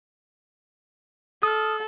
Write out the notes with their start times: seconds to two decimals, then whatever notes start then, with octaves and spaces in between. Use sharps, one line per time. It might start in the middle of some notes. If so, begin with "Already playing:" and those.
1.43 A4 D#6 F6